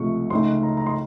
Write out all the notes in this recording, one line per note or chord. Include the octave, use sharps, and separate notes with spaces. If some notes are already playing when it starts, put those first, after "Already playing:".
Already playing: C#2 C3 F3 A3 C#6
C#2 C#3 A3 D#4 C6
A#5
A#5
C6